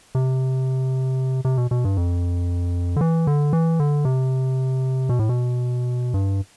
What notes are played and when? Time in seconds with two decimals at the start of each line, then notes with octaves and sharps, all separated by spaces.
0.15 C3
1.45 C3
1.58 B2
1.71 B2
1.85 G2
1.97 F2
2.96 D3
3.01 E3
3.27 D3
3.53 E3
3.80 D3
4.05 C3
5.09 B2
5.19 A2
5.29 B2
6.14 G2